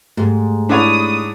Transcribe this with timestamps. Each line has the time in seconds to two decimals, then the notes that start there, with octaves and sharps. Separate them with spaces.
0.17 G#2 A3 G4
0.69 D4 E4 C#5 D#6